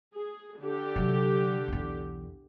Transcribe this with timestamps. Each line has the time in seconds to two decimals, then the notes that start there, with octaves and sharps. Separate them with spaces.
0.15 G#4
0.60 D3 G4
0.96 C3 F#3
1.68 B1 E2